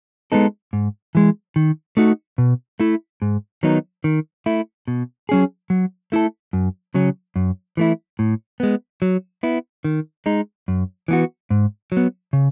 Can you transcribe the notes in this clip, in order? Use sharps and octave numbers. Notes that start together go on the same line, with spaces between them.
G#3 B3 D#4 A4
G#2
E3 G#3
D#3
A3 D#4 F#4
B2
A3 E4
G#2
D#3 F#3 B3 D#4
D#3
A3 E4
B2
F#3 C#4 G#4
F#3
A3 E4 A4
F#2
C#3 F#3 C#4
F#2
E3 A3 E4
A2
G#3 B3
F#3
B3 E4
D#3
G#3 D#4
F#2
E3 B3 F#4
G#2
F#3
B3
C#3